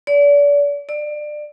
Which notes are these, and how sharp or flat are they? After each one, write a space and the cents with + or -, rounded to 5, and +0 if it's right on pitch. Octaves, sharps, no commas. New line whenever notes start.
D5 -35
D5 +25